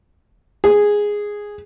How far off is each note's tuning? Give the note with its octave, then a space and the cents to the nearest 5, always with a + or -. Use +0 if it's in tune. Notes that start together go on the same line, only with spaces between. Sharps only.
G#4 -5